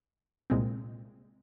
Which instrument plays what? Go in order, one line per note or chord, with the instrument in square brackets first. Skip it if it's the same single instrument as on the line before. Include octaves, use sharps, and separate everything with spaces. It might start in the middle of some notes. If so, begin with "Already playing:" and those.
[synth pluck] C2 A#2 G#3 C4